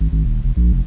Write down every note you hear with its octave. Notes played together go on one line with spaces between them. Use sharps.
G#1
G#1
D#1
E1
A#1
F1